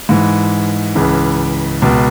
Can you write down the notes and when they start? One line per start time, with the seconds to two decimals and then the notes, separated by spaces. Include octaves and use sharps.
0.09 G#2 E3
0.95 C#2 C#3 E3
1.82 C#2 B2